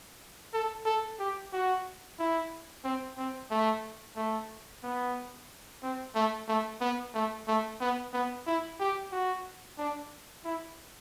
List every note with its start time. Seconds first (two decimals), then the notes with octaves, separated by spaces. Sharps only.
0.54 A4
0.86 A4
1.20 G4
1.53 F#4
2.19 E4
2.85 C4
3.18 C4
3.51 A3
4.17 A3
4.83 B3
5.83 C4
6.15 A3
6.48 A3
6.81 B3
7.14 A3
7.48 A3
7.81 B3
8.13 B3
8.47 E4
8.80 G4
9.12 F#4
9.78 D4
10.45 E4